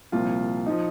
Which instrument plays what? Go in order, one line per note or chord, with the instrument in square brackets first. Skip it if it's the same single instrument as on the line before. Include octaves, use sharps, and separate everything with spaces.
[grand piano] C2 A#2 F3 F4
F3 D#4